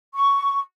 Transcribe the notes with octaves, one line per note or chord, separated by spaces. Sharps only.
C#6